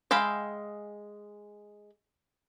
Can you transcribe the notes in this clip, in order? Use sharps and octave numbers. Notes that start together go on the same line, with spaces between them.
G#3 E5 F5 G5 B5